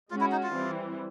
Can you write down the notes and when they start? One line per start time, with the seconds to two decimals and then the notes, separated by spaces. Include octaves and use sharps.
0.10 G#3 C#4 F4 F#4
0.21 E4
0.32 D#4
0.43 F4
0.53 E3 G3 C4